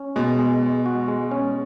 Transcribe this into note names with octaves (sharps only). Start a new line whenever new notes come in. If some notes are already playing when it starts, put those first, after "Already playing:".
Already playing: C#4
B2 G#3
G#3
G#3
F#4
G#3
C#4